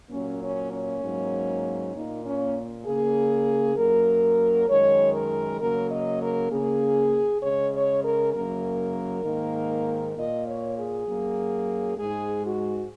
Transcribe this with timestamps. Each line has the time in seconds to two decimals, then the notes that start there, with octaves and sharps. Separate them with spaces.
0.10 A#2 F#3 A#3 C#4
0.41 C#4
0.72 C#4
1.02 G#2 F#3 A#3
1.94 A#2 A#3 D#4
2.24 C#4
2.85 C#3 A#3 G#4
3.76 F#2 F#3 A#3 A#4
4.67 F#2 D#3 G#3 C#5
5.13 A#4
5.59 C#3 F#3 A#3 A#4
5.89 D#5
6.20 A#4
6.50 C#3 A#3 G#4
7.41 C#3 G#3 C#5
7.72 C#5
8.02 A#4
8.32 F#2 C#3 F#3 A#3 A#4
9.24 G#2 D#3 A#3
10.15 A#2 A#3 D#5
10.45 C#5
10.77 G#4
11.06 F#2 F#3 A#3
11.97 G#2 G#3 G#4
12.43 F#4